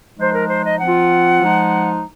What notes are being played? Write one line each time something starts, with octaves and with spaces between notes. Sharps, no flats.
F3 G#3 D#4 C5
A#4
C5
D#5
F3 C4 F4 F#5
F3 G#3 D#4